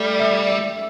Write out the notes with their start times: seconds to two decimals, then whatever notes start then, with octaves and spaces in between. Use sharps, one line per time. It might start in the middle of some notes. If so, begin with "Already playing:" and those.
Already playing: G3 A3
0.19 E5
0.50 E5